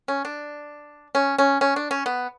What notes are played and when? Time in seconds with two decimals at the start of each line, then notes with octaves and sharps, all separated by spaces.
0.08 C#4
0.25 D4
1.15 C#4
1.38 C#4
1.61 C#4
1.76 D4
1.91 C#4
2.06 B3